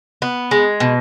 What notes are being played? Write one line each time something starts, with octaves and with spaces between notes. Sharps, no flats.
B3
G#3
B2